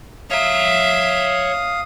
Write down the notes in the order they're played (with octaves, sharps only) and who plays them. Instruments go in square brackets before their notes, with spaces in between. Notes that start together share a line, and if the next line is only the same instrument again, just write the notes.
[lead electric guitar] C#5 A#5 [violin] E5 [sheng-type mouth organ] F5 D#6